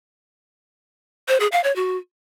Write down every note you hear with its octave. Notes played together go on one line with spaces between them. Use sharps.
C5
G#4
F5
C#5
F#4